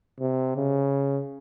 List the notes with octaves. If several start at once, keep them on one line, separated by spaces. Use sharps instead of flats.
C3
C#3